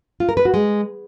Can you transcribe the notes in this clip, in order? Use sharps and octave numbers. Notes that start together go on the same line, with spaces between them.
F4
A#4
B4
F#4
G#3